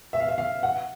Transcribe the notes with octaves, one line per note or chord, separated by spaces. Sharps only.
E5
F5
E5
F5
F#5